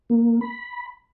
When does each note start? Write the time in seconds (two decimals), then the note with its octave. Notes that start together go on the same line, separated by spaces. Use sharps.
0.10 A#3
0.41 B5